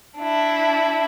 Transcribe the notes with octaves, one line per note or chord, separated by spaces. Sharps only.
D4 E4